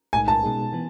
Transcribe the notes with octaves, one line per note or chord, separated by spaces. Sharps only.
B1 A2 G#3 D#4 G#5
A5
B2 G#3 D#4 G#4
E3 B3